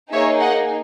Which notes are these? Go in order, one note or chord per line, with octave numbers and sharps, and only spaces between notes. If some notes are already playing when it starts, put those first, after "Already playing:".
A#3 D#4 G#4 C#5 E5
D#5 F#5